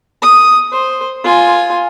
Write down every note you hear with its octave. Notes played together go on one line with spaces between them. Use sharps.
D#6
C5
F4 G#5